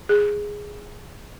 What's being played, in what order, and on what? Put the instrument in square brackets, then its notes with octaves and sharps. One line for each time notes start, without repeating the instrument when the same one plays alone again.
[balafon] G#4